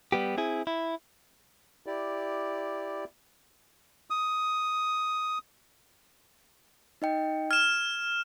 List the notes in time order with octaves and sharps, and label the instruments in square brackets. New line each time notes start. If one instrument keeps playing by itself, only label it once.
[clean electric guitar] G3 B3 G4
C4 E4 G#4
E4
[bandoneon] E4 G4 D5
[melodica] D#6
[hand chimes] D#4 D#5 G5
[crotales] F6 E7 [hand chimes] G#6